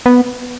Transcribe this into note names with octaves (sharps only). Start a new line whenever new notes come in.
B3